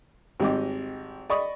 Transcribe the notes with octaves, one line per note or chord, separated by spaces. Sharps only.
G#1 G3 C4 D#5 D6
D5 D#5 B5 C#6 D#6